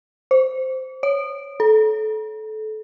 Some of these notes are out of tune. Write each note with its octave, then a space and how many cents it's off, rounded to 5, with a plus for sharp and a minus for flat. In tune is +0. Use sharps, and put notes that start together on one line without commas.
C5 -5
C#5 +10
A4 -25